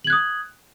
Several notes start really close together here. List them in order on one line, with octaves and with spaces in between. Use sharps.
F#7 G#6 F#6 D#6